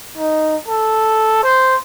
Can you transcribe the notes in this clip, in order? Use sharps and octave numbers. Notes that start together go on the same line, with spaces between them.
D#4
A4
C5